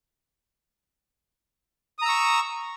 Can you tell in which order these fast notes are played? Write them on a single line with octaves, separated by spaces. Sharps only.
D#6 A#5 E6 C#6